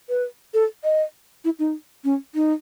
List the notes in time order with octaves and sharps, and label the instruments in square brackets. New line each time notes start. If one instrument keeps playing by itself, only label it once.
[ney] B4
A4
D#5
E4
D#4
C#4
D#4